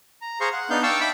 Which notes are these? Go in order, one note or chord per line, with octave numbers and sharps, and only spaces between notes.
A#5
G#4 C5 F5 A#5 C6 C#6
F#5
B3 D4 D#4 F5 G6
F5 G5 A5 C#6 D6 E6
E5 G5 B5 D6 E6